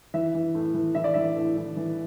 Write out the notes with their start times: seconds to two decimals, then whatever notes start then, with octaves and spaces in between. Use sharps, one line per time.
0.14 E3 E5
0.34 E3
0.55 A2
0.74 E3
0.95 E3 E5
1.04 D5
1.14 E3 E5
1.36 A2
1.57 E3
1.76 E3